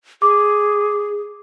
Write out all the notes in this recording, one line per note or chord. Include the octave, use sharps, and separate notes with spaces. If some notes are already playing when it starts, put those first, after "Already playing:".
G#4 D6